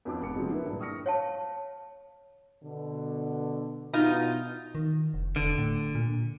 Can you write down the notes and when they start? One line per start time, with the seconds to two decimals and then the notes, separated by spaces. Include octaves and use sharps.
0.05 F2 B3 C#4 F4 C#5 D6
0.22 F1 B3 C#7
0.36 C#3 F3 F#3 G#3
0.51 E4 A#4 B4
0.66 G2 A#2
0.80 C#6 D#6 F6 A#6 C#7
1.06 C#5 F5 A5
2.63 B2 D3
3.93 B2 D#4 F4
4.75 D#3
5.14 F1
5.36 E1 D3
5.58 A2
5.95 A#2